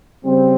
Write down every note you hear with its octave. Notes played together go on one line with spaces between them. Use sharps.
C#3 G3 C4